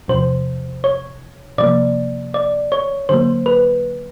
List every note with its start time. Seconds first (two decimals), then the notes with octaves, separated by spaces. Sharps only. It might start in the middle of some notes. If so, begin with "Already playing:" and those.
0.08 E2 C3 F3 C5
0.84 C#5
1.58 C3 F3 A#3 D5
2.34 D5
2.72 C#5
3.09 D3 F#3 A#3 C5
3.46 B4